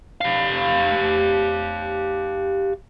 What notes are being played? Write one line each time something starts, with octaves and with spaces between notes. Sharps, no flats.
G4 F5